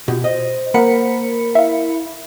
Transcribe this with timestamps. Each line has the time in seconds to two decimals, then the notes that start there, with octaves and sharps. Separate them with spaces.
0.08 B2 F4 G4
0.24 C5 D#5
0.74 A#3 A#4 F#5 B5 C#7
1.55 E4 E5 F5